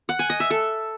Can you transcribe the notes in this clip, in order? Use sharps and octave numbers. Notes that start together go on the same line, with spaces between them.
F#5
G#5
D#5
E5
A4